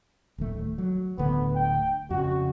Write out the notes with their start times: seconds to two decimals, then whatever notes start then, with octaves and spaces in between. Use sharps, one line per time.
0.38 D1 D#3 A3
0.78 F#3
1.18 D1 D3 A3 B3
1.55 G5
2.10 F2 C#3 F#4